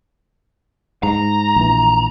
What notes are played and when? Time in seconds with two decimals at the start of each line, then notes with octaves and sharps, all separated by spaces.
1.03 G#2 A#5
1.56 A#1 E3